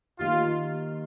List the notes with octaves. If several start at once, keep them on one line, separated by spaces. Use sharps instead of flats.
D#3 A#3 D#4 F4 G4